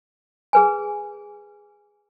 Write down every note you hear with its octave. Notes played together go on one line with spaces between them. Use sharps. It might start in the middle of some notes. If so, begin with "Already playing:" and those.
G#4 B4 G#5